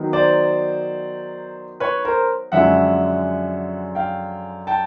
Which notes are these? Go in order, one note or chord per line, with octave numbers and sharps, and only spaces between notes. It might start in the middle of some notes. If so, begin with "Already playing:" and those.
Already playing: D#3 F#3 B3 D#4
C5 D5
B4 C#5
A#4 C5
F#2 D3 F3 G#3 C#4 E5 F#5
F5 G5
G5 A5